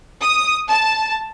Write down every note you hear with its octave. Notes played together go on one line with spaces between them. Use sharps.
D#6
A5